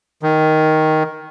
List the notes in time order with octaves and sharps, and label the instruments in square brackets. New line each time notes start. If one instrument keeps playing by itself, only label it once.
[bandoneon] D#3